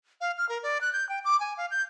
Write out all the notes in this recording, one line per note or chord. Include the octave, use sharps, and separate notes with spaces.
F5
F6
A#4
D5
F#6
G6
G5
D6
G#5
F5
G6